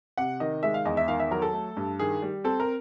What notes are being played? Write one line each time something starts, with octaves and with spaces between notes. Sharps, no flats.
C3 F#5
D#3 D#5
G#3 E5
F5
E2 D#5
E5
D#3 F5
E5
F#3 A#4
A4
A3
G2
D#3 G#4
G3
C4 A4
A#4